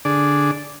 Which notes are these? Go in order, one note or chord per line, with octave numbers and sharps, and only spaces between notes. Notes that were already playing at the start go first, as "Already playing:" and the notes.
D3 D4 G#4 D5